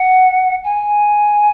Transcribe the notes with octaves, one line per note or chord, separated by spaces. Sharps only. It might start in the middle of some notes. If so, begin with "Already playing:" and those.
Already playing: F#5
G#5